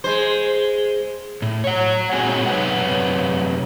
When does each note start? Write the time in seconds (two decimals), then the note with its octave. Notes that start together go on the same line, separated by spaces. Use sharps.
0.04 G#3 C5
1.42 A2
1.64 C#5 F#5
2.13 A#2 G#3 C4 F#4 G#5
2.46 F#2 C3 B4 C#5 F#5